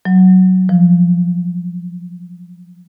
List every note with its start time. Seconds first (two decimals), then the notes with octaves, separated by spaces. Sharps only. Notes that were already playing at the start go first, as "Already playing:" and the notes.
0.05 F#3
0.69 F3